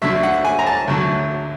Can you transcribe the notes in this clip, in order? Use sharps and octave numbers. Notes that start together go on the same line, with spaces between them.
D2 D3 F#3 A3 E5
F#5
G#5
A#5
A5
D2 D3 F#3 A3